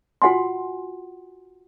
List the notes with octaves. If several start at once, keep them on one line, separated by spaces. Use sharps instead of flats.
F4 F#4 F#5 G#5 C6